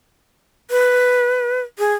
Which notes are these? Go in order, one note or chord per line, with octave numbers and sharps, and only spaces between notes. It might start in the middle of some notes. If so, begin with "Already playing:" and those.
B4
G#4